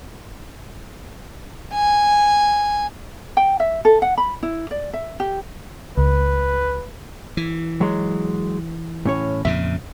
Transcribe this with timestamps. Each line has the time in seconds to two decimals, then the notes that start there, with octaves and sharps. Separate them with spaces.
1.74 G#5
3.37 G5
3.60 E5
3.85 A4
4.02 F#5
4.18 B5
4.43 E4
4.71 D5
4.93 E5
5.20 G4
5.97 C#2 B4
7.37 E3
7.81 F#3 G#3
9.05 A2 C#4 C#5
9.45 F2 A#2 C#3 E5